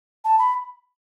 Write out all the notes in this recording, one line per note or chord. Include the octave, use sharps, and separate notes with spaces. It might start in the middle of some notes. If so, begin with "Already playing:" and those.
A5
B5